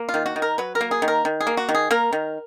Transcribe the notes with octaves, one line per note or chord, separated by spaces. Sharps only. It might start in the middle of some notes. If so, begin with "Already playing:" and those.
Already playing: A#3
F4
D#3
F#4
D#3
A#4
F#3 B4
A#4
A#3
G#4
D#3
A#4
D#3
G#4
A#3
F#4
D#3
G#4
A#3 A#4
D#3